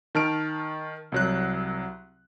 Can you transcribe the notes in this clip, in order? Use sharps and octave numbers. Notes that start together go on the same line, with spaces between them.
D#3 A5 F6 D7
C2 F#3 F#6